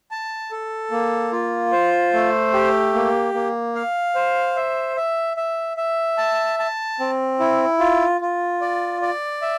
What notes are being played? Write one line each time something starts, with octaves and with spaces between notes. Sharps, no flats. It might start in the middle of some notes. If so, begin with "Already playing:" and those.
A5
A4
A#3
F4
C5
A3
G4
A#3
A#3
F5
C5
E5
E5
E5
E5
A5
A5
C4
E4
F4
F4
D5
D5
E5